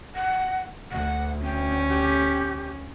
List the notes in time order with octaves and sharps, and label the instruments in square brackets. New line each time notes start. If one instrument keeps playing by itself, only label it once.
[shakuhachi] F#5
[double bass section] D2 [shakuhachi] F#5
[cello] C#4 [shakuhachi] G5
[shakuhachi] G4